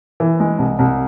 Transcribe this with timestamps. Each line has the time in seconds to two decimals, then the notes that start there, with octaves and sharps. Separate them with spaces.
0.20 E3
0.40 G#3
0.59 C2
0.79 C2